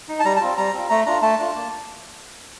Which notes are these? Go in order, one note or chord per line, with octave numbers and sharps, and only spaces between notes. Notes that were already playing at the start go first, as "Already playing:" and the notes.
D#4
A5
G3 A#5
A5
C4 F4
G3 A#5
C4 F4
A3 A#5
D4 F4 A#5
A3 A5
D4 F4
A#3